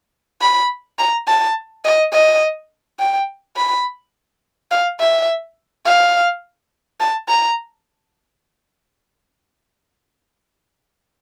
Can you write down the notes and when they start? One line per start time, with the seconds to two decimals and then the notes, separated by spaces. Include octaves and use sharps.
0.41 B5
0.99 A#5
1.28 A5
1.85 D#5
2.13 D#5
2.99 G5
3.56 B5
4.71 F5
5.00 E5
5.86 F5
7.00 A5
7.28 A#5